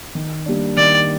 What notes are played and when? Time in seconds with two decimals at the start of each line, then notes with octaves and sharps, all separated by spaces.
0.15 D#3
0.46 G3 A#3 D4
0.77 D#3 D5